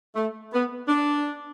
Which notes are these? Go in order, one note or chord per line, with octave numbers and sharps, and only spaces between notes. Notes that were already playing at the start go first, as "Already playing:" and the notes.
A3
B3
D4